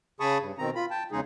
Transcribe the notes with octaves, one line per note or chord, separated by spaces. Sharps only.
C#3 G#4 A5 B5 C#6 D#6
G2
B2 D#3 C4 A#5
F4 B5
G5 A5
E2 C#3 G#3 D#4 G#4